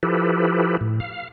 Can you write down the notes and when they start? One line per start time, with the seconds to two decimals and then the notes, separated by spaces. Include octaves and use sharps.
0.03 F3 E4 G4 A4 B4
0.81 A2
1.00 F5